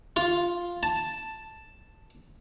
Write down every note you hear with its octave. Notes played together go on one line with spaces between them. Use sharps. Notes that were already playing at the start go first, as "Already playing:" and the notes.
F4
A5